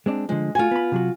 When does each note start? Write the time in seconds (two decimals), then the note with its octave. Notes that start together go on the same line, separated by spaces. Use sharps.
0.06 G#3 C4 D4
0.29 D3 F3 G#3
0.55 A3 F4 F#4 G#5
0.71 B3 B5
0.92 C3 F#3 F#4